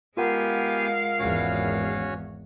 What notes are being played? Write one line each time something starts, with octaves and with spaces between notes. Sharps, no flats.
G#3 B3 F4 G4 A#4 F5 F#5 G#5
G#1 E2 C#4 F#4 C#5